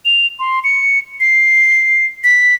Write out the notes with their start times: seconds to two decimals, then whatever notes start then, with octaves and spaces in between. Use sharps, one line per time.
0.05 F7
0.39 C6
0.64 C#7
1.20 C7
2.24 B6